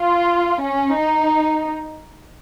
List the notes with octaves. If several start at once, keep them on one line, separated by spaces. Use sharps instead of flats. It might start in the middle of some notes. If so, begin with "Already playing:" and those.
Already playing: F4
C#4
D#4